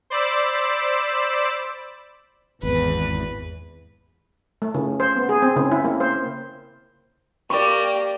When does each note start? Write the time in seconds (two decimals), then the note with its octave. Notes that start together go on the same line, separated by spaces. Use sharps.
0.10 C5 D5 B5 D6 E6
2.63 G#1 E2 B4
4.62 A3
4.74 C#3
5.00 C5
5.16 B3
5.29 G#4
5.42 C4
5.56 C#3
5.72 E4
5.85 A#3
6.00 C5
7.50 A#3 G4 D5 C#6